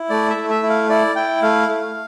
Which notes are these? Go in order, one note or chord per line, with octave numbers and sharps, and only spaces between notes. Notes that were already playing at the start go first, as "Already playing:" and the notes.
Already playing: E4
A3 D5
E5
A3
E5
E4
F5
E4 D5
E4 G5
A3 F5
A3